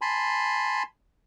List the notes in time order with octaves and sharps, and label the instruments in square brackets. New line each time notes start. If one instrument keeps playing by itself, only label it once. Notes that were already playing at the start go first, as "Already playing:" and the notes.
[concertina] G#5 A5 B5 C6